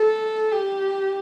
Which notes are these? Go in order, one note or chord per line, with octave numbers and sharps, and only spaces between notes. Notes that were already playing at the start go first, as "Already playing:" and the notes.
Already playing: A4
G4